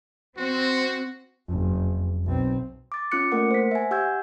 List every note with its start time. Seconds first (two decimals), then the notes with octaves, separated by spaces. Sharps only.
0.37 C4 F#4
1.49 F#1 F2
2.24 B1 C4
2.92 D6 A6
3.12 C#4 F4 D6 F#6 C#7
3.32 A3 A#3 A#4 F#5 C#7
3.51 C5 B6
3.71 E5 G#5
3.91 G4 F#5 E6 G6 G#6